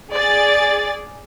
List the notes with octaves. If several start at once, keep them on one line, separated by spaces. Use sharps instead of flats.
G#4 D5 A6